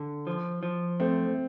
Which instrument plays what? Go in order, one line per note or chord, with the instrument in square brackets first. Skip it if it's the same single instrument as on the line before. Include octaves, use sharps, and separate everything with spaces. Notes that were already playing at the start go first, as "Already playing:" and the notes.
Already playing: [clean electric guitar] D3
F3
F3
[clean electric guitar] A3 [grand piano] C4